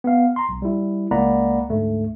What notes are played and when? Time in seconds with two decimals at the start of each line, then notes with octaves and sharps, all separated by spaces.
0.04 B3 F5
0.36 A#5 C6
0.49 B1
0.62 G3 E4
1.11 C#2 A#3 D5 F#5 A#5 B5
1.69 D2 G#2 A3